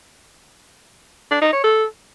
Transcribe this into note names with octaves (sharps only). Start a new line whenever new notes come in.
D4
D#4
C#5
A4